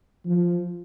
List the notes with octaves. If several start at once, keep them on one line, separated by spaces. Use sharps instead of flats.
F3